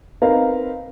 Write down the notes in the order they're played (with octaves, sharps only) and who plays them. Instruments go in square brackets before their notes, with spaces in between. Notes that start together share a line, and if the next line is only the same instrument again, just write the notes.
[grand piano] C4 D#4 A#4 B4 F5